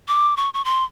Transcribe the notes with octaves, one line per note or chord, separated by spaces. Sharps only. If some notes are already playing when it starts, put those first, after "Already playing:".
D6
C#6
C#6
C6